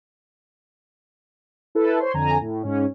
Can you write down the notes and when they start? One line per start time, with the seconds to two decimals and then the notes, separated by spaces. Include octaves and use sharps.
1.75 E4 A4 B4
2.00 C5 C#5 C6
2.14 F2 D3 G#5 A#5
2.41 A2
2.63 G#2 C#4